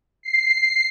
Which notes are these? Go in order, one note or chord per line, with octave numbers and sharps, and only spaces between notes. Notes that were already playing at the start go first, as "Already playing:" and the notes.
C7